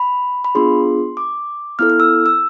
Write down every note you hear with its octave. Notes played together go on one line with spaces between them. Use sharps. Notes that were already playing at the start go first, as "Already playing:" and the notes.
Already playing: B5
B5
B3 D4 F4 G#4 C6
D6
B3 E4 A4 F6
F6
E6
E6